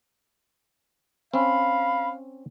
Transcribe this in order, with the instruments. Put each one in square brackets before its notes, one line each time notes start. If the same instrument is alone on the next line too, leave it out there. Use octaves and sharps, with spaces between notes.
[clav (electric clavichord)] C4 C#4 [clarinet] F5 [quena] B5